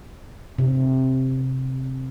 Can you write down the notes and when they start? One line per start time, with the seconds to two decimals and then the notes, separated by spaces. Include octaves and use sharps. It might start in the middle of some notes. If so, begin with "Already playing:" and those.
0.59 C3